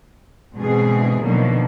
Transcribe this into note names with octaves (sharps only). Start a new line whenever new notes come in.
G#2 B2 D3 E3 C4 G#4
B2 D3 D#3 F3 F#3 A#3